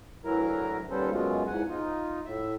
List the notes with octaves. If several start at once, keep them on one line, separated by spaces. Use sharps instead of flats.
D2 E3 F#3 E4 A#4 A#5
D#2 G3 B3 C#4 A4 C5
F#2 B2 F#3 G#3 F4
E2 G#2 F#5 G#5
D#4 F4
A2 E5